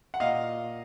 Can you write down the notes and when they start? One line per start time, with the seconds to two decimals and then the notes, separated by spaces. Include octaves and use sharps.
0.14 F#5
0.20 A#2 D#5 F5